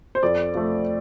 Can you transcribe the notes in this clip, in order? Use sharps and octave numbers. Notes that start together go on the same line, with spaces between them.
C5
F2 D5
F3 A3